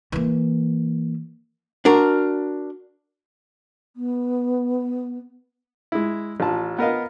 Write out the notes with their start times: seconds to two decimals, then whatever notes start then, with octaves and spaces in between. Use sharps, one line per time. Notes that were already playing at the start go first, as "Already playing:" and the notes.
0.12 E3 A#3
1.85 D4 F#4 A#4
3.96 B3
5.92 G#3 E4
6.40 A1 F4 A5
6.78 B3 A#4 D#5 F5